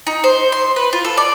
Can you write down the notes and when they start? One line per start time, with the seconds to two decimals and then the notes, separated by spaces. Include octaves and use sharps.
0.07 D#4
0.24 C5
0.52 C6
0.76 B4
0.93 F4
1.04 A4
1.17 D5